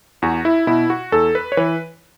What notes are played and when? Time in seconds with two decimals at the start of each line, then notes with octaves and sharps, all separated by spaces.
0.22 E2 F#4
0.45 E4
0.67 B2 E4
0.90 F#4
1.12 E2 A4
1.35 B4
1.52 C#5
1.57 E3 B4